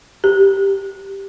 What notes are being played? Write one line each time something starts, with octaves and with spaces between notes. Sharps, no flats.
G4